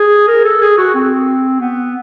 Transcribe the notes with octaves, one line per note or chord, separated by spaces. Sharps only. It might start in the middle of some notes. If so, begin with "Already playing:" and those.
Already playing: G#4
A#4
A4
G#4
F#4
C4
B3